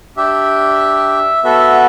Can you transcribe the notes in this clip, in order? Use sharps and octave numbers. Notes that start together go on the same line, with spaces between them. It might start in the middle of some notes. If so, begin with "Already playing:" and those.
D4 G4 E5
B3 F#4 A4 E5